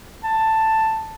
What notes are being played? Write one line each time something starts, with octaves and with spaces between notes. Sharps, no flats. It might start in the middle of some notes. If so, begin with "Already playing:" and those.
A5